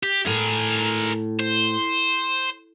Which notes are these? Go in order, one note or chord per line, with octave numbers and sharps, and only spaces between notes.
G4
A2 G#4 A#4
C5